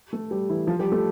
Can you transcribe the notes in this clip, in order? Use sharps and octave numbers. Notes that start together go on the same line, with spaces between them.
A3 A4
G3 G4
E3 E4
F3 F4
G3 G4
A3 A4